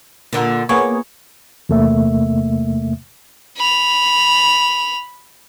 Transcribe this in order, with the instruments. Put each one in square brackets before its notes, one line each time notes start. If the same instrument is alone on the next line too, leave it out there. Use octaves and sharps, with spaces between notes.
[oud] A#2 D3
[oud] A#3 [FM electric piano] B3 G#4 C#5
[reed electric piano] E2 C3 A3 A#3 E5
[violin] B5 F7